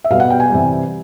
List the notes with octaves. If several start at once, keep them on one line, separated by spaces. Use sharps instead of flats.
E5
B2 G3 B3 F5
F#5
G5
G#5
C3 E3 G3